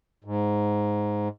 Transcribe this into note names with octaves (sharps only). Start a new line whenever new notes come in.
G#2